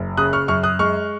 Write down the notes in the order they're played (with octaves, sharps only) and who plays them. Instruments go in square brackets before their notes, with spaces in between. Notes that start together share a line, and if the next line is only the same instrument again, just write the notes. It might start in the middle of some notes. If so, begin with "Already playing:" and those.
Already playing: [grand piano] F#1
C#3 D#6 F#6
C#6 F6
F#2 C#6 F6
D#6 F#6
G#3 C#6 F6